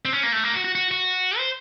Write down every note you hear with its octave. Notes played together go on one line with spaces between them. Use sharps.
C4
C#4
A#3
A3
A#3
F#4
F#4
F#4
F#4
C5